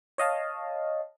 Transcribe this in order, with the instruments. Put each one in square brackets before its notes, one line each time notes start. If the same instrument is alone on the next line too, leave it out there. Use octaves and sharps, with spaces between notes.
[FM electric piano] C#5 D#5 F5 A5